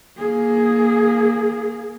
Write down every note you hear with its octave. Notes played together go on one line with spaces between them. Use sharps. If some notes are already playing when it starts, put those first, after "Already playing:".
A#3 G#4